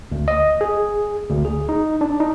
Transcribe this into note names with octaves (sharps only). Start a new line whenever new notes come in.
D2
D#5
G#4
D2
G#4
D#4
D4
D#4